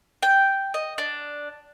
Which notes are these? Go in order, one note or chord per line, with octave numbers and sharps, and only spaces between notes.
G5
D#5
D4